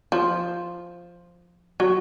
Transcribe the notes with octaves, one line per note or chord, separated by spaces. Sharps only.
F3
F#3